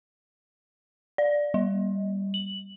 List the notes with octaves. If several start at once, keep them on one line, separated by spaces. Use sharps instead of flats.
D5
G3
F#7